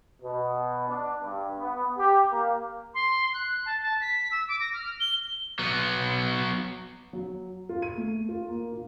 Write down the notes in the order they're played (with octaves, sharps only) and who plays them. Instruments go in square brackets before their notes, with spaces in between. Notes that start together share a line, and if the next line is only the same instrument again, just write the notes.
[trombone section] B2
D4
G2
B3
G4
A#3
[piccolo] C6
F#6
A5
A5
B6
E6
D6
A#6
F6
G7
[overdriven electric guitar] F#3 B3
[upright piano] F#3
F4
D#7
A3
F4
A#3
A#2